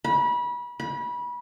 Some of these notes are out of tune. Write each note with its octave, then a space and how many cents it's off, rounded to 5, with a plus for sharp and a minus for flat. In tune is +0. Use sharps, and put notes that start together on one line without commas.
B5 -30
B5 -25